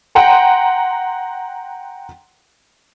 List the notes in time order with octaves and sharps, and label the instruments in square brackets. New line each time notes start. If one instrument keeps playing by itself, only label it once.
[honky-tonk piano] F#5 G5 A#5 C6